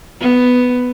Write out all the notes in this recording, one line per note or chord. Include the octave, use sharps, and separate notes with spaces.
B3